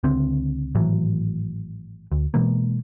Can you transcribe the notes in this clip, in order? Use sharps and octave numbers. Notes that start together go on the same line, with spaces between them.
C#2 D3 C4
G#1 A2 E3 F#3
D2
B2 E3 G#3 A#3